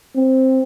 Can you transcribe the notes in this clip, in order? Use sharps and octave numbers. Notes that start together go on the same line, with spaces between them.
C4